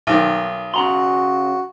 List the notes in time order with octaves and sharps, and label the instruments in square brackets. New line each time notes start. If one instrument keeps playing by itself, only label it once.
[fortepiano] B1 D#3
[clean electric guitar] C#3 A#5 C6 [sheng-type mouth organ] F#4